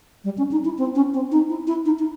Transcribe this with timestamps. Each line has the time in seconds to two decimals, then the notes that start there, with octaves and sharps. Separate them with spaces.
0.24 G3
0.38 C#4
0.51 D#4
0.65 E4
0.78 C4
0.95 C#4
1.14 C4
1.32 D#4
1.49 E4
1.67 E4
1.85 D#4
1.99 D#4